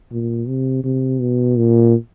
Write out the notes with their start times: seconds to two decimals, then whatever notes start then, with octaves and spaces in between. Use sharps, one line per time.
0.12 A#2
0.48 C3
0.84 C3
1.20 B2
1.57 A#2